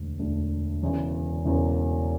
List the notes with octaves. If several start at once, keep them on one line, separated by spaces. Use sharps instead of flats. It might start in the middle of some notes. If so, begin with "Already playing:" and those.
Already playing: E1 D2 D3
E1 D2 D3
E1 E2 C#3 E3
E1 E2 C#3 E3